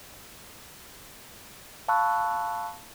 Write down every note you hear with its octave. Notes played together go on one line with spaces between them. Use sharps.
F5 A5 B5 C#6 E6 F#6